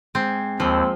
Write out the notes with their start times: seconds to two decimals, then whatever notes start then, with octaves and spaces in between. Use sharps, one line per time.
0.15 G#2 C4 G#5
0.60 D#2 F3 C4 C5